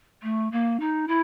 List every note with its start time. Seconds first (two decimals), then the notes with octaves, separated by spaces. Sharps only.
0.23 A3
0.52 A#3
0.80 D#4
1.08 E4